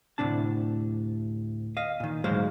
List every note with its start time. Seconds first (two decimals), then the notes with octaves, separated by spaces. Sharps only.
0.18 D2 A2 C3 D4 A5
1.77 D#5 F5
2.00 A#2 D#3
2.24 D2 G#2 F#3 G#3 C5 F5